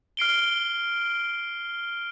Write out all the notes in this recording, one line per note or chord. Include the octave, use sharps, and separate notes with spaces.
F6 C7 D7 G7